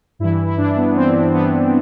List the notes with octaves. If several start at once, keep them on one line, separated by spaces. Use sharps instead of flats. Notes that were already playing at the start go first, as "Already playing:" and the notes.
G2 E3 E4
E4
G2 E3 D4
B3
G2 E3 C4
E4
G2 E3 B3